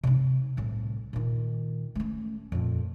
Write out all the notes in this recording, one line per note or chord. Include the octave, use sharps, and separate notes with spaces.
C3 D#4
C2 A2
A#2 D#3
A3 C#4
F2 A#2